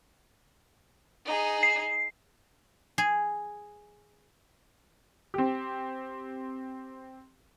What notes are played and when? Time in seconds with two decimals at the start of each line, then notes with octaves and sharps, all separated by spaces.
1.25 D#4 G#4
1.63 C7
2.98 G#4
5.34 C4 G4